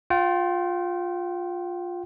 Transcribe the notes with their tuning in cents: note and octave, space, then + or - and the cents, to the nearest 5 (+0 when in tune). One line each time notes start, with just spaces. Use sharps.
F4 +15 G5 -30